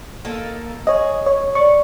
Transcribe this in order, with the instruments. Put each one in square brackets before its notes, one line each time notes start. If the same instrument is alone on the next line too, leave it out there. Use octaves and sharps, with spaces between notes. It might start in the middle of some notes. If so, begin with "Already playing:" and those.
[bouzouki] A#3 D#4 A4
[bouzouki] G#4 [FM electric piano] C#5 D#5
[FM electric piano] C#5
[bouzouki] D5 [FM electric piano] C#6